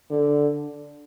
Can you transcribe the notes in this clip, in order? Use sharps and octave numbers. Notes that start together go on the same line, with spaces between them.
D3